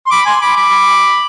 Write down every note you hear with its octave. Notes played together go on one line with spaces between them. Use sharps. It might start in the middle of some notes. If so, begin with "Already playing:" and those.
C6
B5 D6
G#5 C6
B5 D6
B5 D6